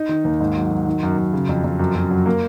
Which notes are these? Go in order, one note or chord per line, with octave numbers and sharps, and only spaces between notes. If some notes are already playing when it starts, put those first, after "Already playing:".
Already playing: D#4
D#3
D#2
G#2
F#3
F#3
D#3
F#2
F#2
C#3
F2
F2
F#2
F#2
F#3
A#3